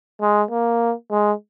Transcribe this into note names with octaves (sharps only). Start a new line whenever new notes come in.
G#3
A#3
G#3